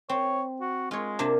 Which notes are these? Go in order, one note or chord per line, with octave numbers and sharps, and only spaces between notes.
C4 C#5
F#4
G#3 F4 C#5
C3 A#3 D4